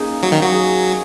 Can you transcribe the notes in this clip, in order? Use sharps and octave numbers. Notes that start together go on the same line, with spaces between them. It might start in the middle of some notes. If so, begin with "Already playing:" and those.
Already playing: A#3 C#4 D#4 G#4
F#3
D#3 D#4
F#3 F#4
G#4